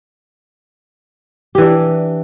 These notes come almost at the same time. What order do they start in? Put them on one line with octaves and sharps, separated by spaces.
G4 E3 D4